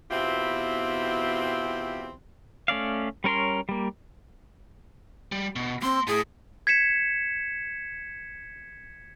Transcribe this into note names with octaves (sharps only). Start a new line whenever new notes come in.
E2 B2 C4 E4 F4 G4
A3 C#4 D5 F5
G3 C#4 A#4 C#5 C6
G3 A#3
G3
B2
A#3 C4 C6
A2 G#4
G#6 B6 C#7 E7